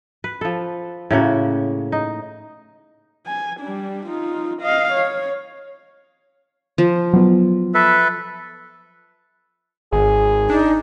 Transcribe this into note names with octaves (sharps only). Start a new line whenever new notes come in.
B4
F3 A4
A2 C#3 A#3 F#4
D#4
G#5
G3 D4
D#4 F4
D#5 F5
C#5
F3
F#3 B3
A4 B4 E5
G#1 G#4
D4 D#4